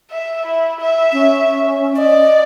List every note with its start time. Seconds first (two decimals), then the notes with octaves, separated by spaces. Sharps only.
0.11 E5
0.45 E4
0.81 E5
1.13 C#4
1.96 D5 D#5